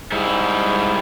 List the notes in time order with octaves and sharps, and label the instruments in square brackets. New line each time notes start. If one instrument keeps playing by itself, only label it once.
[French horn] G#2 [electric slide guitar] G3 G#3 E4